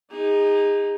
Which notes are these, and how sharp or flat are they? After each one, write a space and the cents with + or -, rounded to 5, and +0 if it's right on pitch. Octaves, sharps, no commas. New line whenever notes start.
D#4 +0 G#4 -35